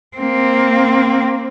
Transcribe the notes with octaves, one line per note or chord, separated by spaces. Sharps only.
A#3 C4